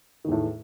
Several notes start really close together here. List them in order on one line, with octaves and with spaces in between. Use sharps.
D#3 E2 A2